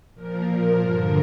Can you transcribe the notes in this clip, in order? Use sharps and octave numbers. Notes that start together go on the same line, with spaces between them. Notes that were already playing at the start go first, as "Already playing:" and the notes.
A#2 F3 A#4
A#4
G2 D3 F3 A#4